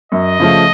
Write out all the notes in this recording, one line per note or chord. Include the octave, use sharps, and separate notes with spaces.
F#2 D#5
C#3 F3 A3